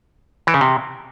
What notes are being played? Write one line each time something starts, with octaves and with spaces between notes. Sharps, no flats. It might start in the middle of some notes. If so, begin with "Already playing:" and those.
E3
C#3
C3